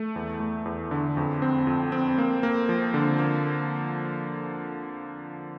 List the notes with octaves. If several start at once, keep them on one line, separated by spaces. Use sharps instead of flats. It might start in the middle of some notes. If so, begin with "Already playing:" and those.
Already playing: A3
E2
A3
E2
D3
F2
C4
F2
C4
A#3
A#3
F3
D3
A#3